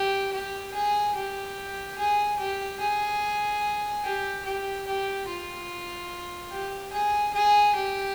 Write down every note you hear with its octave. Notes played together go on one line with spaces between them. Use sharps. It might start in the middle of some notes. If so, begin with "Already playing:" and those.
Already playing: G4
G4
G#4
G4
G#4
G4
G#4
G4
G4
G4
F4
G4
G#4
G#4
G4